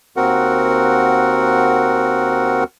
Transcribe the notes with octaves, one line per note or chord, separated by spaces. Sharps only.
D#2 C4 F#4 A#4 F#5